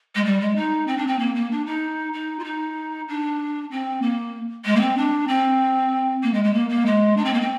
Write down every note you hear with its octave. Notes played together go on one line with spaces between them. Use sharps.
G#3
G3
G#3
D#4
C4
D4
C4
A#3
A#3
D4
D#4
D#4
F4
D#4
D4
C4
A#3
G#3
A#3
C4
D4
C4
A#3
G#3
G#3
A#3
A#3
G#3
D4
C4
A#3
C4